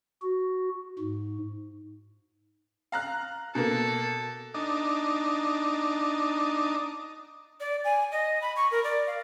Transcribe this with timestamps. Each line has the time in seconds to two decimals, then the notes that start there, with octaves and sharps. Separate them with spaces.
0.22 F#4
0.99 G#2
2.92 F5 A#5 F#6
3.55 B2 A#3 A4
4.54 D4 D#4
7.60 D5
7.84 G#5
8.12 D#5
8.42 B5
8.56 C#6
8.71 A#4
8.84 D5
9.07 F5